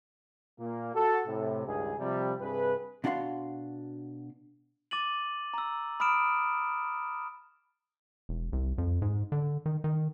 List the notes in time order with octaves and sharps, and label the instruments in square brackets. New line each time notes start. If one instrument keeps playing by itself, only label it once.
[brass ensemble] A#2 A#3
F#4 A4
A2 C3
C#2 G2 D#3 G#4
C3 F3 G3
G2 C3 G#4 B4
[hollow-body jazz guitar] B2 D4 F#4 F5 C6
[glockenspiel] D6 A6 D#7 F#7
A#5 E6
B5 D#6 F6 D7 E7
[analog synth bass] E1
C2
F2
G#2
D3
D#3
D#3